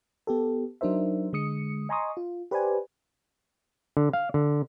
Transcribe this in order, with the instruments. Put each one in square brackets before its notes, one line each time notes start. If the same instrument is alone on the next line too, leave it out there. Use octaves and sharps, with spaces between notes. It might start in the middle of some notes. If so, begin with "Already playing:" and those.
[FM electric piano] B3 G4 A4
F#3 D4 D#4 A#4 C5 E5
D3 G#3 D#6 C#7
D#5 G#5 A#5 C6 C#6 D#6
F4
G4 B4 C5 D5 G#5
[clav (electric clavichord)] D3
F5
D3